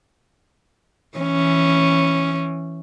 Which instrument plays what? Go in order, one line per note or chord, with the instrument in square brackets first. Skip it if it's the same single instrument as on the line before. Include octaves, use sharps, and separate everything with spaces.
[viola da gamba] E3 C#4